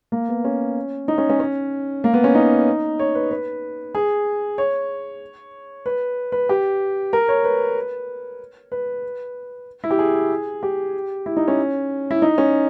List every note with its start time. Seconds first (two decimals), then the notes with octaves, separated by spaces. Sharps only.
0.12 A#3
0.29 B3
0.45 C#4
1.08 D#4
1.18 C#4
1.30 C#4
1.40 C#4
2.04 A#3
2.14 B3
2.24 C#4
2.35 D#4
2.99 C#5
3.15 B4
3.31 B4
3.95 G#4
4.58 C#5
5.86 B4
6.32 B4
6.49 G4
7.13 A#4
7.28 C#5
7.44 B4
8.72 B4
9.84 E4
9.91 G4
9.99 G#4
10.63 G4
11.26 E4
11.37 D#4
11.48 C#4
12.11 E4
12.22 D#4
12.38 C#4